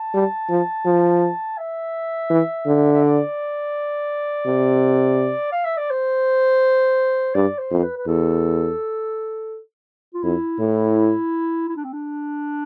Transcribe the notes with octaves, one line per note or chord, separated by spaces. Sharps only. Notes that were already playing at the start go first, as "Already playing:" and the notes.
Already playing: A5
G3
F3
F3
E5
E3
D3
E5
D5
C3
F5
E5
D5
C5
G2 D5
C5
F2
B4
B4
E2 A4
F4
F2 E4
A2
E4
D4
C4
D4